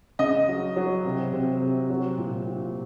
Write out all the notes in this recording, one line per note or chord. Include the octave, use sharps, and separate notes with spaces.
C#3 D#5
F#3
F#3
C3
C3
C3
F#3
A#2
A#2